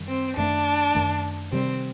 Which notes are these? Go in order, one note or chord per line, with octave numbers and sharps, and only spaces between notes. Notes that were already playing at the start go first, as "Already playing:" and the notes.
Already playing: F#2 D#3 G3
C4
F#2 D#3 A3 D4
F#2 D#3 A3
C3 D#3 G3 C4